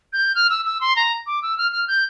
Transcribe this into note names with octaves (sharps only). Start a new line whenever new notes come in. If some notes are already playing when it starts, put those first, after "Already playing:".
G6
F6
E6
E6
C6
A#5
D6
E6
F6
F6
G6